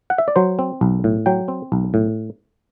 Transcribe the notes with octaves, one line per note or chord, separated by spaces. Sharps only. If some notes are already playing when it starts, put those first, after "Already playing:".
F#5
E5
D5
F#3 C5
C4
B1
A2
F#3 G5
C4
B1
A2